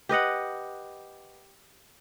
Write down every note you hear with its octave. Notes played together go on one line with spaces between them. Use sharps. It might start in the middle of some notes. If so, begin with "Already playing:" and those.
G4 B4 D#5 F#5